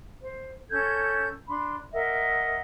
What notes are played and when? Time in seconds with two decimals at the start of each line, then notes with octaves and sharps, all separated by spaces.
0.21 C5
0.69 C#4 A4 G6 G#6
1.47 D4 B5 C6
1.91 A#4 D#5 E5 F#5